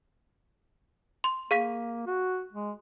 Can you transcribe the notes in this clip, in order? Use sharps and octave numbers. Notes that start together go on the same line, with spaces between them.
C6
A#3 G#4 F5 B6
F#4
G#3